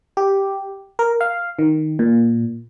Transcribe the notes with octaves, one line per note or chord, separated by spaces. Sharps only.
G4
A#4
F5
D#3
A#2